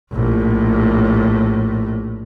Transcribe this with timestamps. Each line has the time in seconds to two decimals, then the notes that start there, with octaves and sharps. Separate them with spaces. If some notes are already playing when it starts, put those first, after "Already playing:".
0.12 A#1 A2